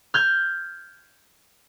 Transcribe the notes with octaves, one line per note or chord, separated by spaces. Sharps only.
F6 G6 G#6